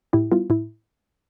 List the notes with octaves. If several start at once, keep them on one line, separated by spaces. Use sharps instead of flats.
A2 E4 G4
G3 B3 E4 F4
A2 E4